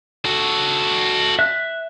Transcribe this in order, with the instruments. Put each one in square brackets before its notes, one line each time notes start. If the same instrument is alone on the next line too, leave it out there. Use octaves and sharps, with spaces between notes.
[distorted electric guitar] F#4 A4
[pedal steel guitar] E5 F#6